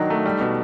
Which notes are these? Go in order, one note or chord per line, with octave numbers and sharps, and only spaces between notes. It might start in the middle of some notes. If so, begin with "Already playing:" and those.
Already playing: D#3 F#3 D4 D#4 D#5
A3
G3
B2